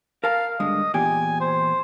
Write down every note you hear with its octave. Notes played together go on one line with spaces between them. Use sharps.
A#4 F5 A5
G2 D3 G#3 D#5
E2 A#2 G4 G#5
C5